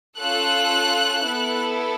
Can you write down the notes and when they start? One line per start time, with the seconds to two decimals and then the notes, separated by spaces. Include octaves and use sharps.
0.19 C#4 F4 A4 F#6
1.25 B3 E4 A4